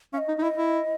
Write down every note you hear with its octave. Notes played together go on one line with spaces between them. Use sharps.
C#4 F5
D#5
D#4
D#4
E4 D#5
E4